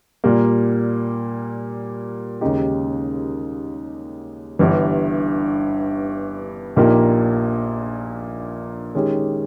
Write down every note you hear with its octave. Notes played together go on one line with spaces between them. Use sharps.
A#2 G3 A#3
D#2 C#3 G#3 D#4 G4
G1 G2 E3
A#1 A#2 A#3 D#4 G4
D#3 G#3 C#4 G4